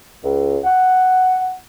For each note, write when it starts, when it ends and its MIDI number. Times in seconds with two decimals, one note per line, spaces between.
0.24 0.59 37
0.65 1.55 78